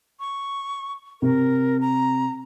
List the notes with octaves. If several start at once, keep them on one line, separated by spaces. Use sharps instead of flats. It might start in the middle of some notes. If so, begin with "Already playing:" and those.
C#6
C3 A#4
A#5